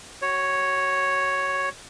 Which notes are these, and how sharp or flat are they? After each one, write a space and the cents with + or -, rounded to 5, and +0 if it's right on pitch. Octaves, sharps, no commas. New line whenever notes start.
F#4 +25 C#5 +0